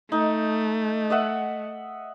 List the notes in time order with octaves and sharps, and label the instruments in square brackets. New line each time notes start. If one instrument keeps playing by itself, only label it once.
[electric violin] A3 [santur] D#4
[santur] D#5 E5 F#5